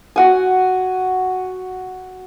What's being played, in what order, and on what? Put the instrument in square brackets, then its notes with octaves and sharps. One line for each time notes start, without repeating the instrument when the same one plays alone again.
[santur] F#4 F#5 G#5